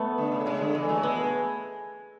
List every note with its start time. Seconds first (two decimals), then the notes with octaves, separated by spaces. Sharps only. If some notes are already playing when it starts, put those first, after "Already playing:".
Already playing: A3 B3
0.18 D3
0.32 C#3
0.46 C#3 G#3
0.61 D3
0.75 E3 G#3
0.88 F#3 A3
1.03 G#3 B3